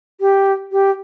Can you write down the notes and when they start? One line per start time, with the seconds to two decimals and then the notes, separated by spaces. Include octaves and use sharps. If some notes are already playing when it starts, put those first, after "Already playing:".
0.21 G4
0.72 G4